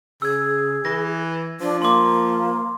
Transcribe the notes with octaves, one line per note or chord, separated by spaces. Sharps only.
C#3 G#4 E6 G#6
E3 A#6
F3 D4
A#3 C6 D6